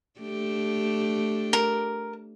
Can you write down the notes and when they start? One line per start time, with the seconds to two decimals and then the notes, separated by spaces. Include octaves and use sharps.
0.20 A3 D4 G4
1.53 A#4